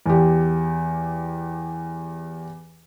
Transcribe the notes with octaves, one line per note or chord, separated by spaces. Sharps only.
E2 G4